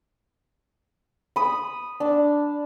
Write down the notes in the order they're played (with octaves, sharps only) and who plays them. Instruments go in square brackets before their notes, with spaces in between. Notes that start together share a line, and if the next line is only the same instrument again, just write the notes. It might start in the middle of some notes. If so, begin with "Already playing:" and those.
[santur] B5 D#6
D4